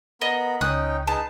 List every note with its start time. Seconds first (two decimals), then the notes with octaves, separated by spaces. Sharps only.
0.22 B3 A#4 D#5 B5
0.61 C#2 C#4 D#4 G5 D#6 F#6
1.07 D#4 G#4 B4 A5